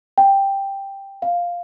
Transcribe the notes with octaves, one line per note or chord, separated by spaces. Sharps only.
G5
F5